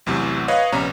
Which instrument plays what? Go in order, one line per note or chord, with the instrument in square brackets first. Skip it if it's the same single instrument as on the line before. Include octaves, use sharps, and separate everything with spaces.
[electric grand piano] A1 E2 C3 F#3
B4 C#5 D#5 F5
A#1 C3 B3 C#4 A#5